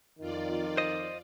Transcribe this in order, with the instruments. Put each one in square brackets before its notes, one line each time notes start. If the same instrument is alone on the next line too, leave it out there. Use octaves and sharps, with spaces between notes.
[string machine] F2 F4 D5 [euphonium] D#3
[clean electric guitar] C5 D#5